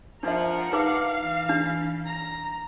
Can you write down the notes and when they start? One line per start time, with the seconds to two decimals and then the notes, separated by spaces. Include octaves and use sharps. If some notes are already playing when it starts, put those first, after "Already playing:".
0.23 F3 D4 A#4 E5 F#5
0.72 D#4 B4 F5 D6
1.19 E3
1.49 D4
2.05 A#5